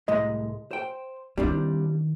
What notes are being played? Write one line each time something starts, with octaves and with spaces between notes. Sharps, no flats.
C2 A2 G#3 D#5
C5 G5
D#3 E3 G3 C4 D4